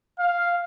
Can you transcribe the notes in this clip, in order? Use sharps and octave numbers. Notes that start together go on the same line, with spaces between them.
F5